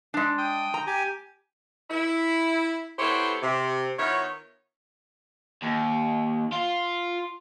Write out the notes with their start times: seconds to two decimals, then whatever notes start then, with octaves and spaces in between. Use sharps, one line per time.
0.14 G#3 D4
0.38 G5 D#6
0.74 A#5
0.87 G4 G#5
1.90 E4
2.99 B3 E4 G4 A4 C5 C#5
3.42 C3
3.98 D#3 B3 E4 F4 C#5
5.62 D#2
6.53 F4